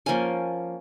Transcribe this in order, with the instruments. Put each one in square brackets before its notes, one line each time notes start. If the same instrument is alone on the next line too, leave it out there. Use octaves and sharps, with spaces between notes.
[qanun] F3 A#3 C#4 G#5